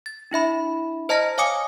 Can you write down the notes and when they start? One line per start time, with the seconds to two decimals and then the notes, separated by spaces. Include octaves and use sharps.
0.06 A6
0.31 D4 E4 E5 B5
1.09 C5 D#5 A5 A#5 F6 A#6
1.38 C#5 F5 G#5 D6 D#6 C#7